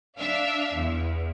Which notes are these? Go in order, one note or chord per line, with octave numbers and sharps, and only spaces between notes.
D4 E5 F5
E2